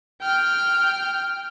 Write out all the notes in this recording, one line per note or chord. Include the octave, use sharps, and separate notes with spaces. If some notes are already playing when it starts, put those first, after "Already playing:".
G5 F6